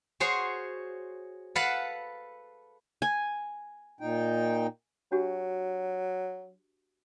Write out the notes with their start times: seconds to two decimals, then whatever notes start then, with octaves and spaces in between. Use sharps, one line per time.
0.20 F#4 G#4 C5 C#5
1.55 A4 B4 F5 F#5 A5
3.02 G#5
4.00 A#2 D#4 G5
5.12 F#3 D4 F#4 G4